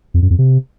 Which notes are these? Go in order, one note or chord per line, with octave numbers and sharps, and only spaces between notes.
F2
F#2
F2
C3